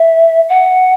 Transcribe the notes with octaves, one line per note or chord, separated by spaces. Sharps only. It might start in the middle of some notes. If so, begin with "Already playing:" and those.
Already playing: E5
F#5